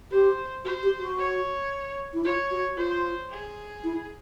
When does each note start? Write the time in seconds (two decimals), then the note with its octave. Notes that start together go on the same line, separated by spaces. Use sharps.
0.11 G4 C5
0.65 F#4 C5
0.83 G4
1.00 F#4
1.18 C#5
2.14 E4
2.24 F4 C#5
2.51 F#4
2.77 F4 C5
3.30 G#4
3.84 E4